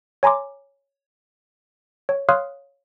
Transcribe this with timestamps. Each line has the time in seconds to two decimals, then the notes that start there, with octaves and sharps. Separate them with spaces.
0.23 C#5 G#5 A#5 C6 D6
2.09 C#5
2.29 C#5 F5 C6 D#6 F6 F#6